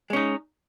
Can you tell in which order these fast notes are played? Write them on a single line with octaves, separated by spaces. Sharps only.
G#3 C#4 D#4